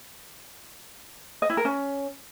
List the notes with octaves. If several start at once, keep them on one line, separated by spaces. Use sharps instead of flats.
D#5
E4
A#4
C#4